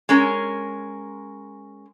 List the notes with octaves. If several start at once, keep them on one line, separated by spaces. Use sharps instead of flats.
G#3 C#4 A#4